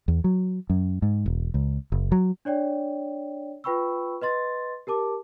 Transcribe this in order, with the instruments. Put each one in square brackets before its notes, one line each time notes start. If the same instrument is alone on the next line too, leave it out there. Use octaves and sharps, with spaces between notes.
[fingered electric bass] E2
F#3
F#2
G#2
E1
C#2
F#1
F#3
[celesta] D4 C#5 D5 G5
F4 B4 G5 B5 C#6 E6
B4 D#5 C6 A6
G4 A#4 A5 D6